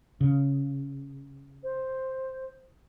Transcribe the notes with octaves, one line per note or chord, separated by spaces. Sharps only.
C#3
C5